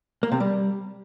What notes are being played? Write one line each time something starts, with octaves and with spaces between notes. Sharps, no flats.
A#3
C3
G3